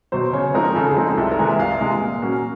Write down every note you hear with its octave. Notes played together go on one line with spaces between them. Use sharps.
B2 F#3 C5
C#3 C#5
F3 G#3 C4 D#4 A#4
C#3 A4
G#4
F3 G#3 C4 D#4
A4
C2 A4
A#4
C3 E3 G#3
E5
C2 F5
C3 E3 G#3
A#2
F#3 A#3 C#4 F#4